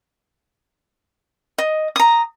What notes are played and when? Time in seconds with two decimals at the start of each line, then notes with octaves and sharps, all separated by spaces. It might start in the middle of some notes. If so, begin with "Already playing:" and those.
1.58 D#5
1.96 A#5 D#6